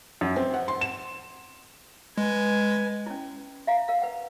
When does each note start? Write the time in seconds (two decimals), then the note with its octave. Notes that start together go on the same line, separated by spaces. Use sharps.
0.21 F#2
0.36 C4
0.54 F#5
0.68 C6
0.81 E7
2.18 G#3 B4 G#5
3.06 C#4 E4
3.67 E5 F5 A#5
3.88 A#4 F5
4.02 B4 F#5